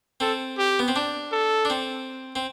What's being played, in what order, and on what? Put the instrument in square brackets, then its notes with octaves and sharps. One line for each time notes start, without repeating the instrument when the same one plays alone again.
[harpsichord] C4 [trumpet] A4
[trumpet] G4
[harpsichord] B3
C4
D4
[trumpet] A4
[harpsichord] D4
C4
C4